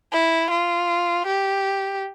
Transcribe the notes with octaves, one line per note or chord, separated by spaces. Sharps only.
E4
F4
G4